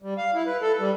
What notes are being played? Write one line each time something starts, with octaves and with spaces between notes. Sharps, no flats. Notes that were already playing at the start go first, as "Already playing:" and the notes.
G3
F5
E4
B4
A4
G3